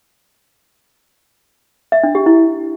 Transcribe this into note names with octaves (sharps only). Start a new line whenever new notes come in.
E5
D4
G4
E4